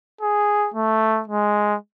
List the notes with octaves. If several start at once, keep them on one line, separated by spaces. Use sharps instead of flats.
G#4
A3
G#3